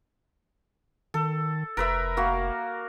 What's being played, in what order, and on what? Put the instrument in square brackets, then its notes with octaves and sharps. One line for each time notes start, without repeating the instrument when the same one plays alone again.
[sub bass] D#3 [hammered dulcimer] A4
[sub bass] F1 [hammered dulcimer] A#4 B4 E5
[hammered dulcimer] A#3 F#4 F5